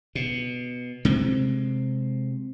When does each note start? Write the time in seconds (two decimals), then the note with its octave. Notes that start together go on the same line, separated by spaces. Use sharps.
0.15 B2
1.05 C3 G#3 C4